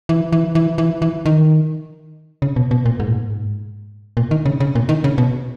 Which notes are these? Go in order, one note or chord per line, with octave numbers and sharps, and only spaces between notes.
E3
E3
E3
E3
E3
D#3
C#3
B2
B2
A#2
G#2
A#2
G#2
A#2
D#3
C#3
C#3
A#2
D#3
C#3
B2